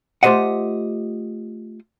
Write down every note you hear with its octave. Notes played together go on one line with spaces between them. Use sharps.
A3 F4 G4 C5 D#5 F#5